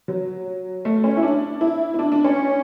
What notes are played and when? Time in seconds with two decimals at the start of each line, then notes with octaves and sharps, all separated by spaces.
0.08 F#3
0.85 A3
1.04 C#4
1.17 E4
1.23 D4
1.61 E4
1.94 E4
1.99 D4
2.12 D4
2.24 C#4